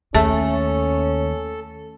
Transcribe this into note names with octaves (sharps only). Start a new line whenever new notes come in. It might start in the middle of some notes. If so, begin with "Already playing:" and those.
D#2 A3 C#4 A4